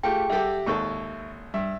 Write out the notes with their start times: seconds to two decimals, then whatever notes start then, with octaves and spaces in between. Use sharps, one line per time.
0.03 A3 F4 G4 G#4 G5
0.30 G3 G4 A4 E5 F#5
0.66 G#1 D#2 A4 C#6
1.54 G2 E5